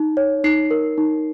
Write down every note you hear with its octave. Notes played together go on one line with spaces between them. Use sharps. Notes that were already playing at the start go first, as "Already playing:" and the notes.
Already playing: D#4
C#5
D#4 C7
A#4
D#4